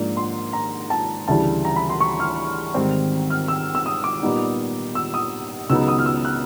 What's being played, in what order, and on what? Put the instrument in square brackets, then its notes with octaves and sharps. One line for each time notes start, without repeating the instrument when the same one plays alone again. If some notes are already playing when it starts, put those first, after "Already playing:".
Already playing: [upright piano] G#2 F3 A#3 D4
C6
A#5
A5
D2 C#3 E3 G3 A5
A#5
B5
C6
C#6
F6
G#2 D#3 G3 C4
F6
E6
E6
D#6
D6
A#2 G3 B3 D#4
E6
D#6
C#2 C#3 F#3 B3 D#4 E6
D#6
F6
E6
F#6